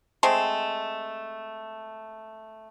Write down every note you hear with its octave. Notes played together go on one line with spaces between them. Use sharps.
G#3 A3 C4